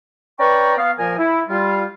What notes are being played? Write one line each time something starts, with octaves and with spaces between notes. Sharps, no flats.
C#4 B4 D5 G5 A#5 C#6
B3 F5
A#2 F3 A#4 G#5
E4
G3 F4